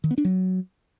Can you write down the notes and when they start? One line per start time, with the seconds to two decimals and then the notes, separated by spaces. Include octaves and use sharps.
0.04 D#3
0.11 B3
0.18 D4
0.25 F#3